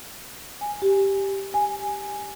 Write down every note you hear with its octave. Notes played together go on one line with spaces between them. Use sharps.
G#5
G4
G#5